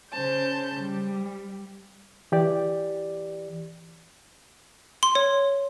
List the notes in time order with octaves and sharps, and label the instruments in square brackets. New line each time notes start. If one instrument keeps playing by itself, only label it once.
[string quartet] C#3 C5 A5 G6
G3
[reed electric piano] E3 G4 D5
[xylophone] C6
C#5